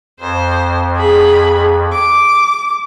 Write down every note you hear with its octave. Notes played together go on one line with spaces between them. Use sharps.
F2 C5
G#4 B5
D6